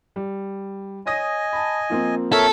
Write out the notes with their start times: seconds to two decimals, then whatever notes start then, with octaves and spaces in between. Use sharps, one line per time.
0.16 G3
1.06 C#5 D#5 G#5 D#6 A#6
1.53 A5 B5
1.90 F3 A#3 C4
2.32 A4 A#4 C#5 E5